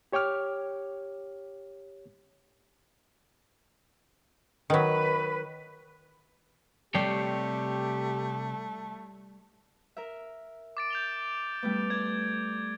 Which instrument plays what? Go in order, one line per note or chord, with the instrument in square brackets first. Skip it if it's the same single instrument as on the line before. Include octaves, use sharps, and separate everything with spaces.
[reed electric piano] G4 C#5 G5 D6 F6
[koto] D#3 F#3 [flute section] B4
[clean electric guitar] C3 C#5 G5 [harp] G3 G6 C7 [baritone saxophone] A3 [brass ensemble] G4
[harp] A#4 E5
[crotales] D6 A6 D7
G6 F7 G7
[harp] G3 A3 B3
[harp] D5 [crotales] G#6